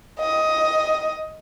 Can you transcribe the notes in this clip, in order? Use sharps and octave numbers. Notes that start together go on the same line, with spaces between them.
D#5